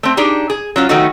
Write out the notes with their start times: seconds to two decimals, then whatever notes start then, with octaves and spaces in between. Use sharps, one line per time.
0.03 A3 C4
0.17 D4 D#4 G4 G#4
0.50 G#4
0.76 F#3 C#4 F4
0.89 D#3 F#3 A3 B3 D#4 F#4